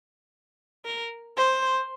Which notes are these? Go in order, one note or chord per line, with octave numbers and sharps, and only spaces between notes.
A#4
C5